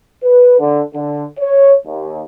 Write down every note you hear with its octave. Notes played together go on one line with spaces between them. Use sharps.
B4
D3
D3
C#5
D#2